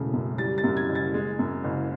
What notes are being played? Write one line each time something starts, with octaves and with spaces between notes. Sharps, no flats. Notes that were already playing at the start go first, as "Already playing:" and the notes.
Already playing: E1 C#3 A3
F#2
G3 A6
A6
F#2
G#6
F#1
A6
G#3
F#2
F#1